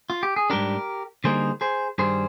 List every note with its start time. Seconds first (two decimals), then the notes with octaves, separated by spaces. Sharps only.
0.10 F4
0.23 G4
0.36 G#4
0.50 G#2 G3 D4 G4 A#4
1.24 D3 G3 A#3 D#4 G#4 C5
1.61 G#4 C5
1.98 G2 D#3 G3 G#4 C5